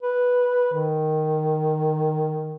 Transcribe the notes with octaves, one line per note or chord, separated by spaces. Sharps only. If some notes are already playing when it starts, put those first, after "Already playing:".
B4
D#3